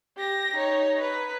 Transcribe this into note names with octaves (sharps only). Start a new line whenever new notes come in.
G4 A#6
D#4 C#5
B4